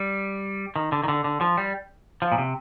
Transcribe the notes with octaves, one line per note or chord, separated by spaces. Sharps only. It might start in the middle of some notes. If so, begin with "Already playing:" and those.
Already playing: G3
D#3
D3
D#3
D3
D3
F3
G3
F3
A#2
C3